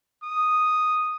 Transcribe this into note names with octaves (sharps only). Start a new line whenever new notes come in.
D#6